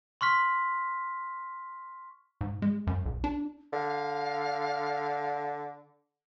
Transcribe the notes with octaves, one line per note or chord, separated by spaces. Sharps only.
C6 C#6 F6 B6
G#2
G#3
F#2
B1
D4
D3 F5